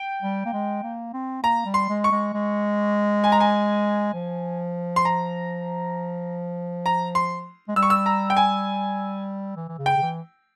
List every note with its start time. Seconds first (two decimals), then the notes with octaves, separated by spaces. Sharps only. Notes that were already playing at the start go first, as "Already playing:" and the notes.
Already playing: G5
0.22 G3
0.45 A#3
0.53 G#3
0.83 A#3
1.13 C4
1.43 A#3 A#5
1.65 G3
1.74 C6
1.89 G#3
2.04 C#6
2.11 G#3
2.34 G#3
3.24 G#5
3.32 A#5
3.40 G#5
4.14 F3
4.96 C6
5.05 A#5
6.86 A#5
7.15 C6
7.68 G#3
7.76 G3 E6
7.83 C#6
7.90 E6
8.06 A#5
8.30 G5
8.37 G#5
9.56 E3
9.69 E3
9.78 C#3
9.86 G5
9.97 C#3
10.02 E3